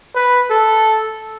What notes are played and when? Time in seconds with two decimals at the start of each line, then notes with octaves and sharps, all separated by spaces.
0.15 B4
0.50 A4